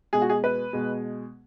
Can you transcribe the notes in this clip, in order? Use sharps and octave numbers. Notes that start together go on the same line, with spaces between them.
B2 G#3 G#4
F#4
G#4
B4
B2 G#3